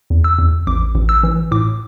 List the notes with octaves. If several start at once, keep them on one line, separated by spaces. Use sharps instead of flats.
E2
E6
E2
A1 D6
A1
E6
E3
A2 D6